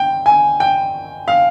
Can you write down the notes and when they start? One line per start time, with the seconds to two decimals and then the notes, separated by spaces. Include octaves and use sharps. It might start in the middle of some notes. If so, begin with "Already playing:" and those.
Already playing: G5
0.26 G#5
0.60 G5
1.28 F5